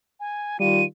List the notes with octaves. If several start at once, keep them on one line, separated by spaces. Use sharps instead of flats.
G#5
D#3 G3 F4 D#7